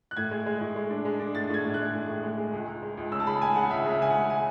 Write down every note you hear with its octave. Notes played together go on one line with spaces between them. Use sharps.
F#6
A2 G#6
G#3
G#3
A2
G#3
D4
G#3
D4
A2 A6
A2 G#6
A2
G#3 F#6
A2
A2
G#3
G#3
C#2
C#2
G#3
C#2
C#3 E6
A5
G#3 B5
C#2 G#5
C#3 F#5
C#2 E5
C#3 E5
C#2 G#5
F#5
G#3
C#3 G#5